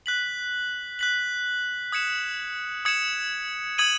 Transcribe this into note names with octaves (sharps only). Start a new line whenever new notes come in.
F#6 B6 F#7
F#6 B6 F#7
D#6 G#6 C#7 E7
D#6 G#6 C#7 E7
D#6 G#6 D#7 F#7